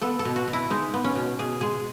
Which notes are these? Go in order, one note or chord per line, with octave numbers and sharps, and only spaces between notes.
B3 A4
A4
B2
F#4
B2
E4
G#3 D#4
B3
C#4
B2
B2 G#4
G#3 G#4